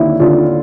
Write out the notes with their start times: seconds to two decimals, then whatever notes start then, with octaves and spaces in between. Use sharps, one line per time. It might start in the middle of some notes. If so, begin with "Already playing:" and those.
Already playing: D#2 D3 E4
0.20 D3 F4